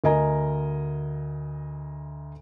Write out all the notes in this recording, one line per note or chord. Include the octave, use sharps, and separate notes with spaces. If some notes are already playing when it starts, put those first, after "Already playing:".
D2 A#4 D#5 G#5 A#5